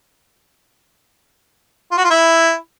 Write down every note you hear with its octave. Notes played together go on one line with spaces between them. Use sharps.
F4
F#4
F4
E4